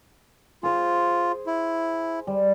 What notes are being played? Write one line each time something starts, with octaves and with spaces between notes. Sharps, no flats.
F4 G#4 C5
E4
G3